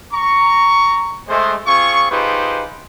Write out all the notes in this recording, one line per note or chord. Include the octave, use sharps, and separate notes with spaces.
A#5 C#6
G#3 A3 C5
C4 F4 G#4 C#6
D#4 F4 G4 G#4 B4 C5